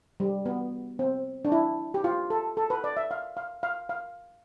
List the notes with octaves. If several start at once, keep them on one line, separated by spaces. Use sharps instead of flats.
G3
B3
C4
D4
E4
G4
F4
A4
A4
B4
D5
E5
F5
F5
F5
F5